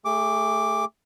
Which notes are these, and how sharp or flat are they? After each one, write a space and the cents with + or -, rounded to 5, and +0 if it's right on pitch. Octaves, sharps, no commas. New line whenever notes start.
A3 +0 G#4 -35 D6 +0